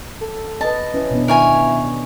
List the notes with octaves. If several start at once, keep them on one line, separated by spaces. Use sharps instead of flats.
A4
B4 D#5 A5
E3 C#4
B2 B3 D4
D#3 E4 A#4 C#5 G#5